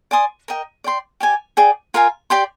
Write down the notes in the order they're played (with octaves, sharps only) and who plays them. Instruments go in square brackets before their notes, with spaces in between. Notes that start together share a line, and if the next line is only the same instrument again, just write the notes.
[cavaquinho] D5 G#5 C6 D#6
A#4 D#5 G5
D5 G5 C6
G4 D5 G#5
G#4 D5 G5
F4 A#4 F5 G#5
G4 D5 G5 C6